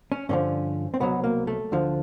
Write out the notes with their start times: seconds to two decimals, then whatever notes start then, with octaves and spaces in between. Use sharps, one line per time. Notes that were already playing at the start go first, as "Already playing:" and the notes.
0.12 C#4
0.29 G2 D3 F3 C#4
0.94 C4
1.00 C2 B2 F#3 B3
1.24 A#3
1.47 A3
1.72 D2 D3 F3